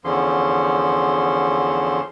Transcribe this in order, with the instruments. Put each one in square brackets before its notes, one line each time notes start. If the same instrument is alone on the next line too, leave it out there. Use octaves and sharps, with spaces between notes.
[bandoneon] E2 D3 F3 C#4 C6